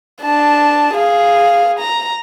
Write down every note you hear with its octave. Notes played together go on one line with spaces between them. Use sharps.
D4 A5
G#4 F5
A#5